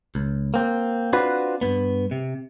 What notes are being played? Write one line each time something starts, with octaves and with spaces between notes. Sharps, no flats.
C#2
A#3 C4
C4 D4 F4 F#4 B4
G2 B3
C3